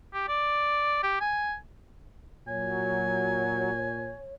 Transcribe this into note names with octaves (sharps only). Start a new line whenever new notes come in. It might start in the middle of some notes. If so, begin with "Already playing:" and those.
G4
D5
G4
G#5
A#2 F#3 C#5 G#5